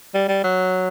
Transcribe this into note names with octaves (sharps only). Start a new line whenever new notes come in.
G3
G3
F#3